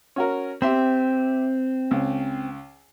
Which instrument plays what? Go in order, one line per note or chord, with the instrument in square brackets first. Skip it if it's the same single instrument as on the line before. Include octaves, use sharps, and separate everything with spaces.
[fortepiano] C#4 F#4 A#4
[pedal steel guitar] C4 [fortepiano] G4 E5 C6
[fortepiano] C#2